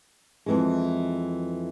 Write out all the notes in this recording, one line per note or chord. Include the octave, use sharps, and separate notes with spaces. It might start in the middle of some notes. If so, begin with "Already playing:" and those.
F2 E3 G#3